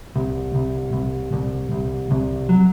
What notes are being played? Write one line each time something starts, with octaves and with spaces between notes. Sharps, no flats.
C2
C2
C2
C2
C2
C2
F#3